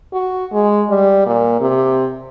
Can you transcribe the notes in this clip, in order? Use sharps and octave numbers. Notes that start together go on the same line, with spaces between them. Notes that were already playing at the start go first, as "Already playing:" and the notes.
F#4
G#3
G3
A#2
C3